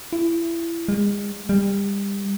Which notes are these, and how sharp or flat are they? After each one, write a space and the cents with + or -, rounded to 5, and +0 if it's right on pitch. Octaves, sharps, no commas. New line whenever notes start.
E4 +25
G#3 -35
G3 +30